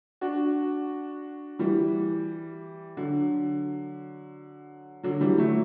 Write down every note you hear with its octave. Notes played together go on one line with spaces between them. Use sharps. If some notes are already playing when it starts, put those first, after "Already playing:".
D4 F#4
E3 G3
D3 F#3
D3 F#3
E3 G3
F#3 A3